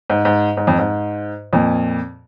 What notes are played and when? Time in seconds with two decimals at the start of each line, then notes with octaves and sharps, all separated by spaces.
0.10 G#2
0.25 G#2
0.57 G#2
0.67 F2
0.78 G#2
1.53 F2 A#2